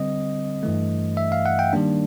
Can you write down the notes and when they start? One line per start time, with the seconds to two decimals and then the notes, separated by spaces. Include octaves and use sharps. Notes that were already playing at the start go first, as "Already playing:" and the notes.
Already playing: D3 G3 C4 D#5
0.63 G2 E3 A3
1.17 E5
1.32 F5
1.46 F#5
1.59 G5
1.73 D#3 G3 A#3 D4